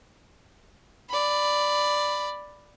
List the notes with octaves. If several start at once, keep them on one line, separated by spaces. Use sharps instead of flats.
D5 B5